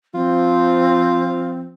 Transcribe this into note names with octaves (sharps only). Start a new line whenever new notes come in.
F3 C4 F4